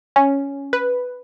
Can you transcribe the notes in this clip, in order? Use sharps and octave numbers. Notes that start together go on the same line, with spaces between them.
C#4
B4